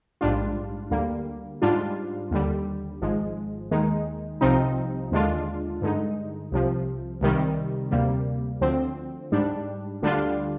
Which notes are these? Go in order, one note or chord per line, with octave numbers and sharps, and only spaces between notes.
A#1 G#2 G3 D4 F4
D2 D3 G3 A#3
G#2 G3 D4 F4
D#2 D3 G3
G#1 G#2 F3 G#3
D#2 D#3 G#3 D#4
C2 C3 F3 C4 D#4
D#2 D3 G#3 D4 F4
G2 D3 G#3 D#4
C2 C3 F3
C2 C3 D#3 G3
D2 C3 G3 A#3
D2 D3 F3 C4
G#2 G3 D4
D2 D3 G3 D4 F4